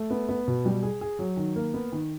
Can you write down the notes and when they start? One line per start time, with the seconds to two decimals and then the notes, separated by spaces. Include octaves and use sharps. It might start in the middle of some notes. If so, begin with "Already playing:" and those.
Already playing: A3
0.11 B3
0.29 B3
0.48 B2
0.66 G3
0.83 G#4
1.01 G#4
1.19 F#3
1.37 D#3
1.56 A#3
1.74 B3
1.92 D#3